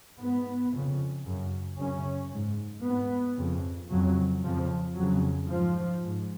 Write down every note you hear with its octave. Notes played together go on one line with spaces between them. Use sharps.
G#2 B3
F2 C#3
F#2 C#3
F#2 C#3 C#4
G#2
G#2 B3
F2 C#3
F2 C#3 F#3
F2 C#3 F3
F2 C#3 F#3
G#2 F3
G#2